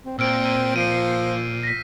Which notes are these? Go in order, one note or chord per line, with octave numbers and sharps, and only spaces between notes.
C4
A#2 C4 E6 F6 D7
E6 G6 D#7
F3 C7 D7 D#7
A#6 B6